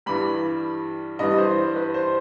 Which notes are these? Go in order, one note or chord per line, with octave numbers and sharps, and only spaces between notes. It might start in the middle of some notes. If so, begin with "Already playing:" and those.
G2 E3 G3 B5
G2 E3 G3 D#5
C5
B4
C5